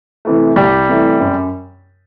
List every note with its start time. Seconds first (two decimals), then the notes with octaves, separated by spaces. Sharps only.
0.25 C3 E3 A3
0.56 C2 G3 G4
0.89 C3 E3 A3
1.21 F#2